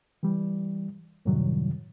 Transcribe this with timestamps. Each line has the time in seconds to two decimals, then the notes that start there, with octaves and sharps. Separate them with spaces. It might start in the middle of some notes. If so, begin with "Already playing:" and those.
0.23 E3 G3
1.25 F#2 A2 C3 D#3 F#3 G3